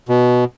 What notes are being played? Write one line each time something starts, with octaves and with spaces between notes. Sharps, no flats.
B2